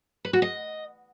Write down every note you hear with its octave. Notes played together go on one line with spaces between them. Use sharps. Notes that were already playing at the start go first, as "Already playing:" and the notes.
B4
F#4
D#5